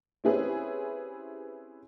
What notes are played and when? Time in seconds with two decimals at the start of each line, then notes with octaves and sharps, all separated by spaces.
0.24 C4 C#4 E4 G4 G#4 B4